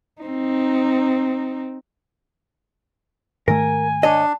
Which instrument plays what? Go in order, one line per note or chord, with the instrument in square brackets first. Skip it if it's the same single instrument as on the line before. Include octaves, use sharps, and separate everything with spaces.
[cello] C4 D#4
[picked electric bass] G#2 D#3 A3 [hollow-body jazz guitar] A#4 [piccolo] G#5
[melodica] D4 [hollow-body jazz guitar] C#5 D#5